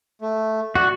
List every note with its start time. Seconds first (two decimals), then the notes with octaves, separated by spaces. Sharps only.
0.21 A3
0.75 F#4 D5